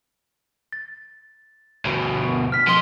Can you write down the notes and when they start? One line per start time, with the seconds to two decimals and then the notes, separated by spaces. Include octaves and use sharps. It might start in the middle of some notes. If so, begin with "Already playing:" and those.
0.72 A6
1.85 D2 B2
2.52 F6 B6
2.67 F3 D#5 C6